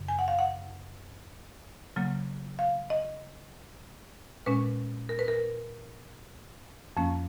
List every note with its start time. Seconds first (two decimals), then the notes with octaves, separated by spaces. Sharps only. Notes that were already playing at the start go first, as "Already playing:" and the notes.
Already playing: F#2 C#3
0.08 G#5
0.19 F#5
0.28 F5
0.39 F#5
1.96 C#3 F#3 A#3
2.59 F5
2.90 D#5
4.46 A#2 G#3 C#4 B4
5.09 A#4
5.19 B4
5.28 A#4
6.97 F2 F3 A#3 C#4